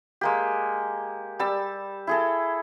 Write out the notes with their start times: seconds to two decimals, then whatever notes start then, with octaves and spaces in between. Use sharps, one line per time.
0.21 G#3 A#3 G4
1.39 G3 A5 E6
2.07 E4 G#4 A4